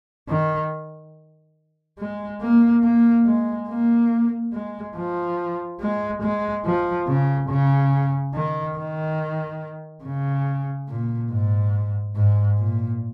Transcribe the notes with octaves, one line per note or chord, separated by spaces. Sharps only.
D#3
G#3
A#3
A#3
G#3
A#3
G#3
F3
G#3
G#3
F3
C#3
C#3
D#3
D#3
C#3
A#2
G#2
G#2
A#2